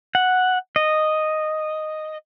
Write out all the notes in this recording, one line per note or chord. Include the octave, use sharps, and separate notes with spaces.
F#5
D#5